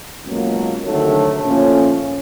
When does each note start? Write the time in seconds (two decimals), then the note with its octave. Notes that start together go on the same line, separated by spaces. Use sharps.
0.24 C#2 B2 F#3 A#3
0.83 D2 C3 D#3 F#3 A3
1.42 A#2 F3 A3 C#4